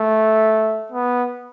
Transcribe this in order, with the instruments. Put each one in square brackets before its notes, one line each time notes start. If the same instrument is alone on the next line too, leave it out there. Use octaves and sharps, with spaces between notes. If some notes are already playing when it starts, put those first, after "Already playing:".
Already playing: [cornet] A3
B3